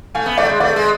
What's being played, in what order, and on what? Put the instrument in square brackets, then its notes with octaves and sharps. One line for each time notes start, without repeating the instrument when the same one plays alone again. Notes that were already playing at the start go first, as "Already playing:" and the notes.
[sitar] A3 [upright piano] F5 G#5
[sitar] B3
[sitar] A3 [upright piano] D5 F#5
[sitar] G#3
[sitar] A3 [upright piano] B4 D5
[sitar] G#3